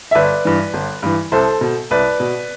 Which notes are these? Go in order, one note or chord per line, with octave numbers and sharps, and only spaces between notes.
E5
G1 B4 D5
G2 E3
G1
G2 E3
C2 A4 C5
B2
C2 B4 D5
B2